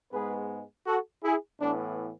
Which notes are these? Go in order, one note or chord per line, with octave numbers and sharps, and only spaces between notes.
G#2 G#3 B3 G#4 B4
F#4 A4
E4 G#4
A2 E3 B3 D4